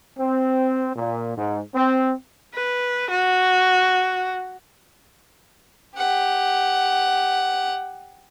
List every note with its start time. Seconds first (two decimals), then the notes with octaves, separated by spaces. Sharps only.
0.18 C4
0.96 A#2
1.37 G#2
1.75 C4
2.54 B4
3.10 F#4
5.97 G4 F#5